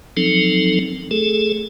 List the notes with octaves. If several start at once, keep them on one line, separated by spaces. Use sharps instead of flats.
F3 F#3 C4 D#4 A4
A3 G#4 A4